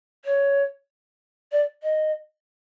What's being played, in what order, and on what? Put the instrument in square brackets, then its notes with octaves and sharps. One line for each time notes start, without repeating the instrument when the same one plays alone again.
[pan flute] C#5
D5
D#5